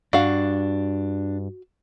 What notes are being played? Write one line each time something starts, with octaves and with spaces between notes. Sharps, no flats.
G2 D4 F#4 F5